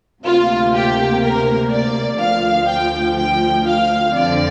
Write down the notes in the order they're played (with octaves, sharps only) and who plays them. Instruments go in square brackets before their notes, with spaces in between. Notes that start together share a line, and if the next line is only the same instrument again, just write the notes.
[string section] D2 C3 A#3 F4
G4
A#4
D5
D2 D3 F3 F5
G5
G5
F5
F2 D3 F3 C4 D5